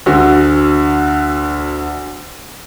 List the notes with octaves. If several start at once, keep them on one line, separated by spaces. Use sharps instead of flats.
D2 D3 F#4